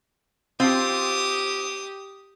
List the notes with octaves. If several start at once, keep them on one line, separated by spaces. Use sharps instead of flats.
C4 F4 G4 D#6